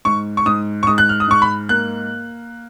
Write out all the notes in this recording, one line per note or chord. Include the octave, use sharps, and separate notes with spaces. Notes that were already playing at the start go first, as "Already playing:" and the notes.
G#2 C#6
C#6
G#2 D#6
C#6
G#2 D#6
F#6
F6
D#6
G#2 C#6
B5
A#3 F#6